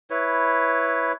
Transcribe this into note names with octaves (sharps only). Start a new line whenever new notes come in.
E4 B4 C#5